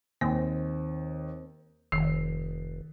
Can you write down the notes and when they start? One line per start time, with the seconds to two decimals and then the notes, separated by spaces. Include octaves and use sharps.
0.21 D#2 A#3 C4
1.92 F1 D#3 C7